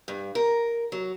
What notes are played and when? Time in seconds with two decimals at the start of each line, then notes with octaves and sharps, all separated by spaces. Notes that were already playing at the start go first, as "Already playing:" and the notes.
0.08 G2
0.35 A#4
0.92 F#3